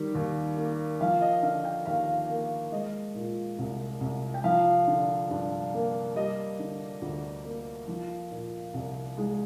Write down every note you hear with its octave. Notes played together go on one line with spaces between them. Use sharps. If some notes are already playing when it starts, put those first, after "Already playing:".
Already playing: D#3 G3
D#2
A#3
F3 F5
D#5
D3 F5
G5
D#2 F5
A#3
G#3 D#5
A#2
C2
C2
G5
F3 F5
D3
G2
A#3
G3 D#5
D3
D2
A#3
F3
A#2
C2
G#3